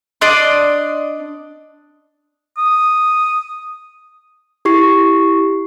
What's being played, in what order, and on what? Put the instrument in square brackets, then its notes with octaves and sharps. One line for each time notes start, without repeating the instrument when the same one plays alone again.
[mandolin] D4 D5 D#5 C6
[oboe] D#6
[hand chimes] E4 G4 C#6 C7